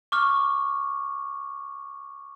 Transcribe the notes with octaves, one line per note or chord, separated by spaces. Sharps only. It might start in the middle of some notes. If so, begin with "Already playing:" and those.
C#6 D6 F6